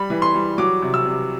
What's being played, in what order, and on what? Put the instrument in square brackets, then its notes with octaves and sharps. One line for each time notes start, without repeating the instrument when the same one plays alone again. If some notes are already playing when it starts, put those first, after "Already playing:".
Already playing: [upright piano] G3 B5
E3
C6
G3
F#3 D6
C3
E6
C3